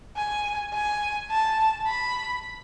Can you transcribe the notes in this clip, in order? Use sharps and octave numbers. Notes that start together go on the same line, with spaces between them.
G#5
G#5
A5
B5